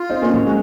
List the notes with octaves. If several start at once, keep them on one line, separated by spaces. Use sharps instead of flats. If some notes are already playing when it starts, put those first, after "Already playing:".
Already playing: F4
C4 D#4
A#3 C#4
F#3
G#3 F#4